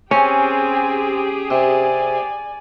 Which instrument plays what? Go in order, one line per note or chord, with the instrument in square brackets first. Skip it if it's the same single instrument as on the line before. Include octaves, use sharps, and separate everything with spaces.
[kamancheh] C4 G#5 [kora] C#4 [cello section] G4 G#4
[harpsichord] C3 [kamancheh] D5 G#5